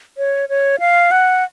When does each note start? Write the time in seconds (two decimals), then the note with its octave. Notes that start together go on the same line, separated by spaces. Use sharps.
0.18 C#5
0.49 C#5
0.80 F5
1.11 F#5